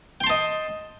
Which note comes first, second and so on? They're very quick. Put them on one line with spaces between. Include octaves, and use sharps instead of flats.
G5 C6 A5 D#5